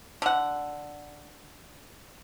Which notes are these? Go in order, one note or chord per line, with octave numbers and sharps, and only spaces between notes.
D3 F#5